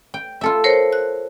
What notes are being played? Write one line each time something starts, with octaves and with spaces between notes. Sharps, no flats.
G5
F4 A4 E5
A#4 C5 C#5
F#6